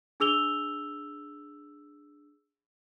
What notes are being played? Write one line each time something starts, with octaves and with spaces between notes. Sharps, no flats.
D4 G#4 E6 F7 G7